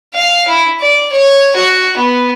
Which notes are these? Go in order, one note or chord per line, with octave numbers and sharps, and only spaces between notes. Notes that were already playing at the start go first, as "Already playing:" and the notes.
F5
E4
D5
C#5
F#4
B3